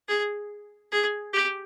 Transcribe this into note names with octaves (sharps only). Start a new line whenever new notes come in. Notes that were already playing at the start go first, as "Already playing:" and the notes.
G#4
G#4
G4